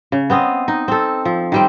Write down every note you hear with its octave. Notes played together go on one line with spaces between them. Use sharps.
C#3
B3 C4 D#5 F5
D#4
C4 A4
F3
D#3 G3 C4